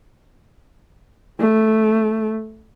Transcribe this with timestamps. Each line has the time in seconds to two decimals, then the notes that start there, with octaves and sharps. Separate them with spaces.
1.39 A3